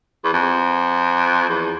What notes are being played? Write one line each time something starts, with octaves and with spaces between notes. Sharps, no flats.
E2
F2
E2